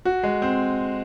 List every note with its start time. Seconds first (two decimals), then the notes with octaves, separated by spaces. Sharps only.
0.05 F#4
0.23 G#3
0.42 C4